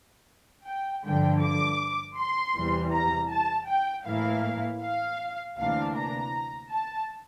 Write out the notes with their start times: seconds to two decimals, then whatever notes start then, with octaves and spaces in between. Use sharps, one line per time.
0.66 G5
1.04 G2 D3 F3 G5
1.42 D6
2.18 C6
2.55 E2 C3 E3 G3
2.93 A#5
3.31 A5
3.69 G5
4.06 A2 E3 A#3 E4 F5
4.82 F5
5.58 D2 C3 E3 A#3 D4 F5
5.96 A#5
6.71 A5